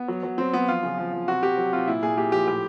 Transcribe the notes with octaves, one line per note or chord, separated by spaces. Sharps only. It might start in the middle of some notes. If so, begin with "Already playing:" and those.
Already playing: B3
F#3
F#3
F#3 C4
F#3 B3
F3 F4
C#3
F3
F3
C3 F#4
C3 G4
F#3
C3 F4
A#2 E4
A#2 G#4
A#2 G4
F3 G4
A2 G4